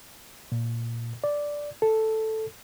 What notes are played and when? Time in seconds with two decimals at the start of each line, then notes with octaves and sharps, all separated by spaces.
0.52 A#2
1.24 D5
1.82 A4